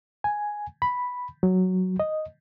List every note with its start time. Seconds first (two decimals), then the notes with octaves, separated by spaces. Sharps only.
0.24 G#5
0.82 B5
1.43 F#3
2.00 D#5